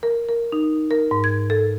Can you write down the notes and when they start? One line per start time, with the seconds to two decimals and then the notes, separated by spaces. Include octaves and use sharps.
0.03 A#4
0.29 A#4
0.52 D#4
0.91 A#4
1.11 G#2
1.24 G#6
1.50 A4